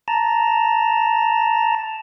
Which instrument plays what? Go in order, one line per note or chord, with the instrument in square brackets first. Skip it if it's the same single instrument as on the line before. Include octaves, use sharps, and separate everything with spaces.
[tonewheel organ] A5 A#5